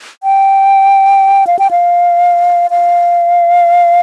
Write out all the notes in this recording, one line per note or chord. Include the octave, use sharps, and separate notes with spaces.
G5
F5
G5
F5
F5